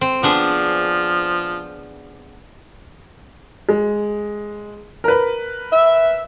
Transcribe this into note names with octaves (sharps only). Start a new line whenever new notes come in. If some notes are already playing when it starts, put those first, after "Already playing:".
C4
F3 B3 D4 G#4
G#3
A#4 B4
E5